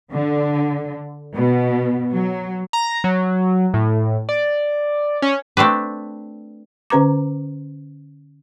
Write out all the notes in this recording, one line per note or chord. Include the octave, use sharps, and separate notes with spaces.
D3
B2
F#3
A#5
F#3
A2
D5
C#4
A3 C4 D4 B4
D3 C#4 B4 A#5 D6